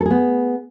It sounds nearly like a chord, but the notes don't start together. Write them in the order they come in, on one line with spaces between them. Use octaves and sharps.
A4 G#4 B3